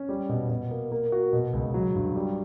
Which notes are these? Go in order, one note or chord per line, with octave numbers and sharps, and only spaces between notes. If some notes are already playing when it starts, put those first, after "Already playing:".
Already playing: C#4
G3
B2
B2
A#3
A#3
F#4
B2
C#2
F#3
G2
G3